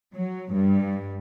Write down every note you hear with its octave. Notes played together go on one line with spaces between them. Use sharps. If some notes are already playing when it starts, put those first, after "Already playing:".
F#3
G2